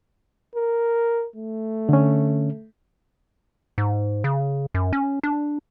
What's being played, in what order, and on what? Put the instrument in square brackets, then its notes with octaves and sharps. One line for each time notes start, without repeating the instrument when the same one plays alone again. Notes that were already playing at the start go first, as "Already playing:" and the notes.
[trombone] A#4
A3
[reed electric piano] D3 C#4
[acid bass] G#2
C#3
F#2
C#4
D4